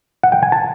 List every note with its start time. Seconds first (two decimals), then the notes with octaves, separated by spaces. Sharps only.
0.23 F#5
0.32 G5
0.43 G#5
0.52 A5